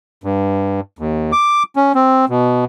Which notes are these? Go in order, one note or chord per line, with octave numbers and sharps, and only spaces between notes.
G2
D#2
D6
C#4
C4
B2